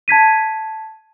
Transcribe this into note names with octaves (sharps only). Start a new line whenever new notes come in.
A5 G#6 B6 D#7